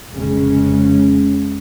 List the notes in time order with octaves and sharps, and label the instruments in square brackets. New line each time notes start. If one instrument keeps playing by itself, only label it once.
[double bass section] F1 C#3 G#3 C#4